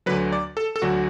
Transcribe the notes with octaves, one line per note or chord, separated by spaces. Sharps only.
D2 D3 F#3 B4
D5
A4
A4
D2 D3 F#3 F#4